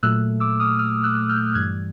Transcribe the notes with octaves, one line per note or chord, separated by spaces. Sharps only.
A#2 F#3 A3 E6 F#6
D6 E6
D#6 F6
D#6 F6
E6 F#6
F6 G6
G2 E3 G3 F#6 G#6